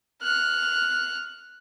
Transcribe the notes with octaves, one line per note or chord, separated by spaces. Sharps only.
F6 F#6